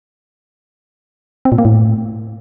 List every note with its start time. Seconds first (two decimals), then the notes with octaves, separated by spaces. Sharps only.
1.45 C4
1.52 A#2
1.58 A#3
1.65 A2